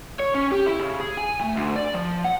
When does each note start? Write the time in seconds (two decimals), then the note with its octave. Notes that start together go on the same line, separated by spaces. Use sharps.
0.20 C#5
0.34 C#4
0.52 G4
0.66 E4
0.80 C#3
1.00 G#4
1.18 G#5
1.41 A3
1.57 D2
1.76 D5
1.94 F3
2.24 F#5